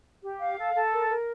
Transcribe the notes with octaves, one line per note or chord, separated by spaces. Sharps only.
G4
F5
A4
A4
A#4
A#4